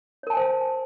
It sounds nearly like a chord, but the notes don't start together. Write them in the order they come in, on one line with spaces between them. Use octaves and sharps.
C#5 A#4 A5 G#5 C5